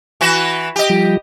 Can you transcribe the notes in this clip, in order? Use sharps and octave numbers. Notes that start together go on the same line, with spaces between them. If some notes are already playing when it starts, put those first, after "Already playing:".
E3 F#4 B4
G4 D#5
F3 G3